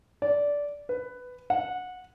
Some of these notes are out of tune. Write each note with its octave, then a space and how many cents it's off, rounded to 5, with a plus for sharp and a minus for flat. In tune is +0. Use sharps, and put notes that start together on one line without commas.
D5 -15
B4 +10
F#5 -20